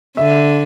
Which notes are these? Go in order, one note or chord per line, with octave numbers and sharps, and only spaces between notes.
D3 E5